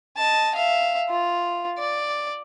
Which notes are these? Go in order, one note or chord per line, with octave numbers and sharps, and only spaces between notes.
D#5 A5
E5 F5
F4
D5